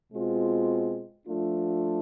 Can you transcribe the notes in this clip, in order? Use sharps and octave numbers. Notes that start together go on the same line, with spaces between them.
B2 G#3 C4 F4
F3 A3 D4 F4